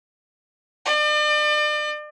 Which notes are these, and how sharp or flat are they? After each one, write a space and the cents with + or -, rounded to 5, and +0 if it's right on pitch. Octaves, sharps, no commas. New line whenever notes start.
D5 +40